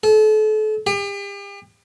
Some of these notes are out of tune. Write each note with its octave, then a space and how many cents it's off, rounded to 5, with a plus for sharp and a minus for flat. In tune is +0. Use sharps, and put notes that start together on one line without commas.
A4 -35
G4 +40